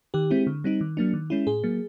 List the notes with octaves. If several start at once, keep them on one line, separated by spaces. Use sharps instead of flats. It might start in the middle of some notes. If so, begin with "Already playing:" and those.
D#3 G4
G#3 C4 E4
D3
G3 C4 D#4
D#3
F#3 A#3 D4
D#3
G#3 C#4 E4
A2 G#4
F#3 A#3